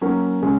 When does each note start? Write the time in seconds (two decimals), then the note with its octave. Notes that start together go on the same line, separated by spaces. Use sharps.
0.02 F#3 A#3 C#4
0.42 C#3 G#3 C#4